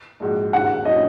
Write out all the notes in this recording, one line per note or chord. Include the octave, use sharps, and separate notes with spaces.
A#1 G#2 G#3 F#4
D#2 C#3 A#3 F#4 F#5
A#2 F#3 C#4 F#4 D#5